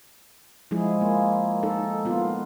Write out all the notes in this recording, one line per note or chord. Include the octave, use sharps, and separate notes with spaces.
F3 G#3 E4 G#4
A#3
D#4 A4
A#3 B3 F4